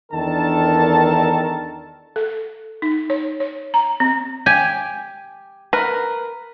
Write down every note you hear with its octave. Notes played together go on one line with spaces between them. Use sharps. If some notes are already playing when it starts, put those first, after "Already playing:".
E2 D#3 D4 A4 A#4 A5
A4
D#4
C#5
C#5
A#5
C4
G4 G#5
A#4 B4